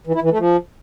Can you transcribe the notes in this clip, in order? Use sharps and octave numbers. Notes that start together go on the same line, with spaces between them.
E3
E4
E3
A3
F3